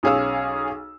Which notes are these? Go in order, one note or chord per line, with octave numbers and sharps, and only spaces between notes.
B1 C#4 G#4 C#5 F5 E6